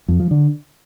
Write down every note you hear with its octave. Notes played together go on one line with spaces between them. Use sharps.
F2
F3
D3